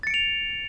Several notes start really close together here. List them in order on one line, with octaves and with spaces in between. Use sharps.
A6 C#7 D7 F7